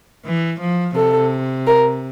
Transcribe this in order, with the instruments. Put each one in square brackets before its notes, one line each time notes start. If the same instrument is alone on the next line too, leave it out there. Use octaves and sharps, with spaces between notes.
[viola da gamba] E3
F3
[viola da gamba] C3 [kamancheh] A4
[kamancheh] A#4